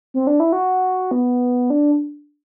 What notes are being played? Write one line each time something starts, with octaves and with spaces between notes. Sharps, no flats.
C4
D4
E4
F#4
B3
D4